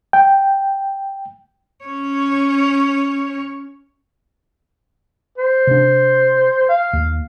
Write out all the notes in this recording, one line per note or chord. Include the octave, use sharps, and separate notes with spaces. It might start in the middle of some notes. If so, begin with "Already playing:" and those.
G5
C#4 C#5
C5
C3 D4
F5
D#2